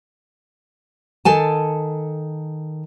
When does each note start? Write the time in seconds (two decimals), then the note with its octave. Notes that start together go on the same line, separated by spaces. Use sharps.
1.25 D#3 A4 G#5 A5